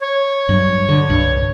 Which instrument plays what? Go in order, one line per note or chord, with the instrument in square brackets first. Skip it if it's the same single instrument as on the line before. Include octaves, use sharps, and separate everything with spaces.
[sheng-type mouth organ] C#5
[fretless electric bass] G2 F#3
D3
C2 G2